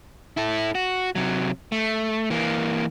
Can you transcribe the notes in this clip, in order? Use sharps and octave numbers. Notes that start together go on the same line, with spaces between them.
E4 A4
F#4
C3 F#3
A3
E3 A#3